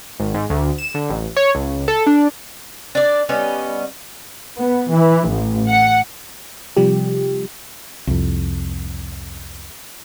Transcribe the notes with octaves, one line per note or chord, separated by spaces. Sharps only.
G#1
G#2
D2
E7
D3
A1
C#5
C#2
A4
D4
D4 D5
G3 B3 C#4 D#5
B3
E3
A1
F#5
C3 F3 G3 G4
C2 F2